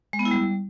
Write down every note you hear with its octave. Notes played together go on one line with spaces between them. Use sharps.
G#3
B3
E4
G3